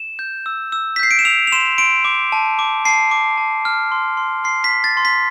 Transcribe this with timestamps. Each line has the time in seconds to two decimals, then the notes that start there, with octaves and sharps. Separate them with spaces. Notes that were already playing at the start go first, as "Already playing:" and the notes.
Already playing: E7
0.19 G6
0.46 E6
0.72 E6
0.96 B6
0.99 G6 C7
1.11 D7
1.19 E7
1.25 E6 F7
1.47 F7
1.52 C6 E7
1.78 C6 D7
2.05 D6
2.32 A5
2.59 D6
2.85 A5 C7
3.11 D6
3.38 A5
3.65 F6
3.92 C6
4.17 C6
4.44 C6 C7
4.64 B6
4.71 C6
4.84 A6
4.97 C6
5.05 B6